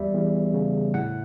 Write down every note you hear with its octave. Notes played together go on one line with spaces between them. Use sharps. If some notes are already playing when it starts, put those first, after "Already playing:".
Already playing: E2 G3 E5
E2
C#3
A2 F#5